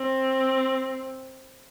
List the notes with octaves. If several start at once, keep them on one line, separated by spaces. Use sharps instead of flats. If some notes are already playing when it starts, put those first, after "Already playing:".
Already playing: C4